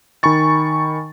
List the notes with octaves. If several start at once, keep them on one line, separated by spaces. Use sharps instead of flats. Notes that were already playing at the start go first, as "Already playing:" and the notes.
D#3 G#5 B5 C#6 A6